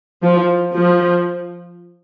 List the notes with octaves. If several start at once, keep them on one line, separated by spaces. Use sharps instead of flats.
F3
F3